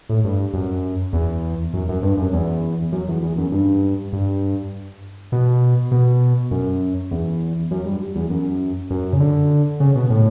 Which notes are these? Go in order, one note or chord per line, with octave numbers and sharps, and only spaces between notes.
A2
G2
F#2
E2
F#2
F#2
G2
F#2
E2
F#2
E2
E2
F#2
G2
G2
B2
B2
F#2
E2
F#2
G2
E2
F#2
F#2
C#3
D3
C#3
B2
A2